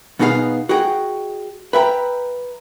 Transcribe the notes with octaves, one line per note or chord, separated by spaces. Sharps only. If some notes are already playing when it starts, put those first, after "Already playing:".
B2 B3 D#4 G#4 A4 F5
F#4 G#4 D#5 G5
B4 E5 G5 A#5